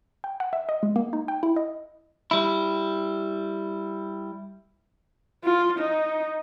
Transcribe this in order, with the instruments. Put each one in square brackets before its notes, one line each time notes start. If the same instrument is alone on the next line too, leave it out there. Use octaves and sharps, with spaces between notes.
[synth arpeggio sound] G5
F#5
E5
D#5
G#3
A#3
D#4
G5
E4
D#5
[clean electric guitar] G3 E4
[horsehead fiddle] F4
D#4